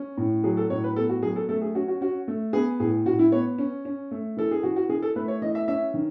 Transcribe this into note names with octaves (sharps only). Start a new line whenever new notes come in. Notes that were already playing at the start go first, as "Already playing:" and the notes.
Already playing: C#4
A2
F#3 G#4
A4
A2 C#5
B4
B3 A4
F#4
F#3 G#4
A4
A3 A4
G#4
C#4 F#4
F#4
C#4 F#4
A3
B3 G#4
A2 G#4
A2 F#4
E4
B3 C#5
C#4
C#4
A3
E3 A4
G#4
E3 F#4
F#4
E3 G#4
A4
A3 B4
C#5
E3 D#5
E5
C#4 E5
D#3